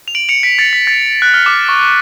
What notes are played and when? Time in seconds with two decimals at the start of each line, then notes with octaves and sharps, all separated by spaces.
0.08 F7
0.15 D7 F#7
0.29 C#7 F7
0.43 B6 D7
0.59 A6 C#7
0.73 B6
0.87 A6
1.22 F#6
1.34 F6
1.46 D6
1.69 C#6